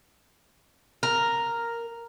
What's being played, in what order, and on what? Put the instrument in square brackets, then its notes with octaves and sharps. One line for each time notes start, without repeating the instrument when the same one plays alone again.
[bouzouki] A#4